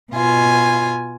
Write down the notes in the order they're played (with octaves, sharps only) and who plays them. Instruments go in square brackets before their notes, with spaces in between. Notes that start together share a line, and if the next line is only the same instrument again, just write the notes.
[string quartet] B2 F4 G#5